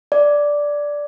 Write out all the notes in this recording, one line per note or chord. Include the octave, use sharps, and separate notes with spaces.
D5